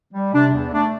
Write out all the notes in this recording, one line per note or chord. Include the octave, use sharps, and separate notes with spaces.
G3
C3 D4
E2
A3 D4